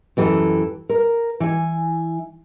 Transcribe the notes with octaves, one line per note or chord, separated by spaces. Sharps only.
F#2 E3 G4 A4
A#4
E3 G#5